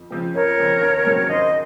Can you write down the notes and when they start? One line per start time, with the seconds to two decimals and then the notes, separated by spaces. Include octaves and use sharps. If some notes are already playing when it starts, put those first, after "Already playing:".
Already playing: F2
0.11 C#3 F3 C4
0.34 F2 A#4 C#5
0.59 C#3 F3 C4
0.81 D#2
1.04 C#3 F#3 C4
1.28 D#2 C5 D#5